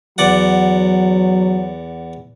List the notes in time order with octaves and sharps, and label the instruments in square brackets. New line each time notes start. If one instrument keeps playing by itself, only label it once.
[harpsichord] E2 D5 F#5 [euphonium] F#3